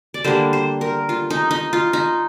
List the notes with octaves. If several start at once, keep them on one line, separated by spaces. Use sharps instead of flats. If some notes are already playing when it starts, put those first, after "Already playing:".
D5
D3 G3 A#3 C5
C5
A#4
F4
D#4
D#4
F4
D#4